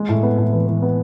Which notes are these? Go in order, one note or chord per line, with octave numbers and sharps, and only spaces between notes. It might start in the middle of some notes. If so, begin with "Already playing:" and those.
Already playing: G#3
A2
B3
A2
E3
E3
B3